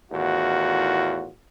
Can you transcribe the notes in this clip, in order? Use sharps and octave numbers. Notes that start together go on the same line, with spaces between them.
E2 A2 D#3 F4 F#4